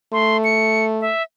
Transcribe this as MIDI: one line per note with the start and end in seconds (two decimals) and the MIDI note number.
0.13 1.10 57
0.13 0.37 84
0.44 0.85 97
1.01 1.23 76